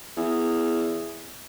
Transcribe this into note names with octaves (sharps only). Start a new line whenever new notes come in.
E2